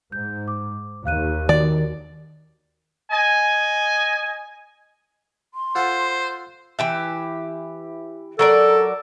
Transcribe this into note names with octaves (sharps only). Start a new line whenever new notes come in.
G#2 G6
D6
D#2 F5 F#6 D#7
D#3 F#4 D5
D#5 G#5
C6
F4 A4 C5 F#5
E3 G4 E5
F#3 A4 A#4 D5